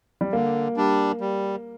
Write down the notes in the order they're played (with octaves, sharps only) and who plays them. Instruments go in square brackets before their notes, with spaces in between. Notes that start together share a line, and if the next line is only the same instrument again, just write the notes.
[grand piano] G3
[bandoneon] D3 [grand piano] A#3
[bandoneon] G3 D4
G3